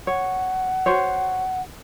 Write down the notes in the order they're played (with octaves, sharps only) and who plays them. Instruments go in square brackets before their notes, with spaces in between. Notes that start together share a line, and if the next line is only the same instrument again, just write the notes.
[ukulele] C#5 [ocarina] F#5
[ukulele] F#4 C5 C#5